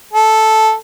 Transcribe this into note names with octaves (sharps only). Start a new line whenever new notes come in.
A4